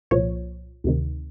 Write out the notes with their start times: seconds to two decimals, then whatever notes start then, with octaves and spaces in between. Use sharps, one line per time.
0.11 C2 A#2 F3 C#5
0.84 D2 C3 D#3